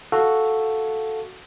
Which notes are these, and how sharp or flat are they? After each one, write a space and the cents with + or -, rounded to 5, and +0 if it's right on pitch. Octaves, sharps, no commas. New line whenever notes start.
F#4 +0 A4 +0 F5 +0